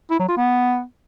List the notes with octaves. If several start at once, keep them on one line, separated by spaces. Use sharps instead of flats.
E4
F#3
F4
B3